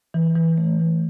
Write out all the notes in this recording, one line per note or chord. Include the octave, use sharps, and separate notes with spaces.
E3
E3
A3
E3